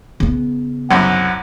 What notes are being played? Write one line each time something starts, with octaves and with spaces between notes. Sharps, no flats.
C#3 B3
C2 F#2 F#5